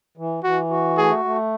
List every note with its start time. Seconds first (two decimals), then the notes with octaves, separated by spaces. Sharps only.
0.17 E3
0.43 E3 F#4
0.70 F#4
0.97 A3 G#4
1.25 A3